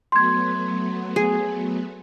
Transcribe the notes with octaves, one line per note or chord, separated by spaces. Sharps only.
F#3 A3 B3 C6 G#6
G#4